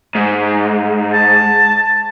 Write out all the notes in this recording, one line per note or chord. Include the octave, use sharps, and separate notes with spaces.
G#2
A5